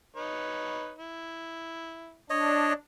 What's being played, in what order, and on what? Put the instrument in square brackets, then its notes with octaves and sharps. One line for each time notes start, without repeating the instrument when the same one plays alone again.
[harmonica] D#4 B4 C#5
E4
[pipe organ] D4 [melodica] C#5 D#5